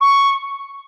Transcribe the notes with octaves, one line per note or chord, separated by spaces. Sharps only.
C#6